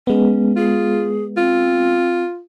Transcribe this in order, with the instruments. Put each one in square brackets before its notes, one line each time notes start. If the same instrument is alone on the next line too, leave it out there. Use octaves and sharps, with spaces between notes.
[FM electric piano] G#3 B3 [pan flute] C#4
[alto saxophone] F4 [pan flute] G#4
[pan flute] C4 [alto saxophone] F4